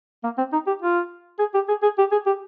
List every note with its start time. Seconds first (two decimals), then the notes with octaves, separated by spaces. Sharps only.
0.24 A#3
0.38 C4
0.53 D#4
0.67 G4
0.82 F4
1.39 G#4
1.54 G4
1.68 G#4
1.83 G#4
1.98 G4
2.12 G#4
2.26 G4